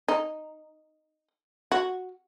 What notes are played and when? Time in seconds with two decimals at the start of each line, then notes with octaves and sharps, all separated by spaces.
0.08 D#4
1.72 F#4